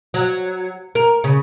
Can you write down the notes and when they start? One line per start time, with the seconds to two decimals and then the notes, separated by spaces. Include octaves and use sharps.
0.14 F#3
0.95 A#4
1.24 C#3